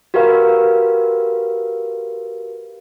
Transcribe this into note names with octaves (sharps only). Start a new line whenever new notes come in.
F#4 G4 A#4 B4 F5